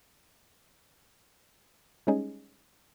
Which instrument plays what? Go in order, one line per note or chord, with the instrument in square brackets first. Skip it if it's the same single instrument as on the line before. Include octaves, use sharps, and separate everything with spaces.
[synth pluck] G3 G#3 C#4 D#4 G#4